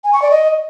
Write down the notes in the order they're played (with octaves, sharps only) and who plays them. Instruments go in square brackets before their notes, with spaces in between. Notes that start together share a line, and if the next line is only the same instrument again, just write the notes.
[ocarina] G#5
C#6
D5
D#5